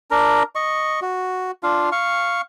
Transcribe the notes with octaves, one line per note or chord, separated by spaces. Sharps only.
D4 A#4 A#5
D#5 C#6
F#4
D4 F4 F5
F5 C#6